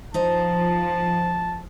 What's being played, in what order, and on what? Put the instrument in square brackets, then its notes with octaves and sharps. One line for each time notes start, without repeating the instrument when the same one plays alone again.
[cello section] F3 [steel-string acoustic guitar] D#4 C5 [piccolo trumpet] A5